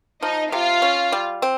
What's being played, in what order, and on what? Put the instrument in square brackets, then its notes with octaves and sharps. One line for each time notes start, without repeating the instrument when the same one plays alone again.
[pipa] F3 [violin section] D#4 D#5
[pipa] C3 [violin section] F4 F5
[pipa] C#4
G3
C4